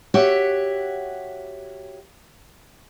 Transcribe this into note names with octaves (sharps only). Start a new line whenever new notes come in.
F#4 G4 C#5 E5 F#5